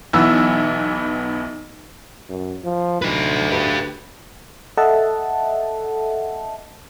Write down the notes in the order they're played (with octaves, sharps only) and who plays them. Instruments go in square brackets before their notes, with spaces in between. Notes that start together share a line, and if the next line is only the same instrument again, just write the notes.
[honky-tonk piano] B1 E3 B3 E6
[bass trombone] F#2
F3
[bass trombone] D2 [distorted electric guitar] D#4 B4
[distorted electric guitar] G4 B4
[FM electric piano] A4 D#5 E5 F#5 A5